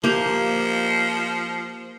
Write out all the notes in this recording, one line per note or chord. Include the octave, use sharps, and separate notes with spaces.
F3 A#3 G4